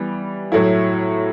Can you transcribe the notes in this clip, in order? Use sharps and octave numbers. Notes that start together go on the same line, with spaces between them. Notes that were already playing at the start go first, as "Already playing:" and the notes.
Already playing: E3 G3 B3
A2 F#3 A3 E4